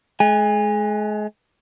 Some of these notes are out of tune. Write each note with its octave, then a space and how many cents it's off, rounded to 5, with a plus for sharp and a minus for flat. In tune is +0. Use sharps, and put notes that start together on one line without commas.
G#3 +35 G#5 -25